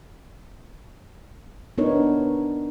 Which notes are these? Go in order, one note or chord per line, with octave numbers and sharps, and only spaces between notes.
B3 D4 D#4 A#4 C#5